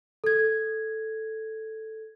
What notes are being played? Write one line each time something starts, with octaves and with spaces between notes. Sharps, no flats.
A4 G#6